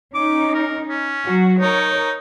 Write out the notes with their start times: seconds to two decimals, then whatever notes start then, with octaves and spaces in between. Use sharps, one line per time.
0.15 C#4 D#4 D6
0.54 A#4
0.89 C#4
1.26 F#3 F#4
1.61 D#4 A#4 C#5